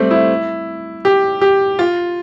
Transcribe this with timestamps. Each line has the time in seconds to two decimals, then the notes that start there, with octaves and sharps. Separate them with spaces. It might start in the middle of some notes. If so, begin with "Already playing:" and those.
Already playing: G3 A3 C4
0.11 E4
1.05 G4
1.41 G4
1.79 F4